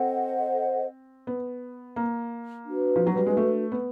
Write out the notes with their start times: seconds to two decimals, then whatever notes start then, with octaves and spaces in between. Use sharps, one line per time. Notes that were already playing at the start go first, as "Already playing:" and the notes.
Already playing: C4 A4 C5 D#5 F#5
1.27 B3
1.96 A#3
2.66 D4 F#4 B4
2.96 F3
3.07 F#3
3.16 G3
3.26 G#3
3.37 A3
3.72 B3